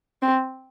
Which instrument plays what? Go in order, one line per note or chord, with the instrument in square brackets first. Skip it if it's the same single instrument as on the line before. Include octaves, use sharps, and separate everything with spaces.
[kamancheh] C4